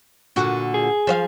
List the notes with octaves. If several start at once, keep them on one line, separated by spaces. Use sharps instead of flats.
A#2 D3 F#4
G#4
F3 C5 F5